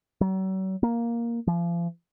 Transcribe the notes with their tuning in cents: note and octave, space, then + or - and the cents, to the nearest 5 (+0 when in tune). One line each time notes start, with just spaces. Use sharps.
F#3 +40
A#3 +5
F3 -35